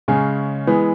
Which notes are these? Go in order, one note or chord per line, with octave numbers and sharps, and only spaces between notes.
C#3 G#3 C#4
E3 G#3 B3